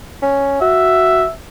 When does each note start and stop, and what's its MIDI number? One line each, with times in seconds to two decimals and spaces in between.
0.22 0.58 61
0.61 1.24 66
0.61 1.32 76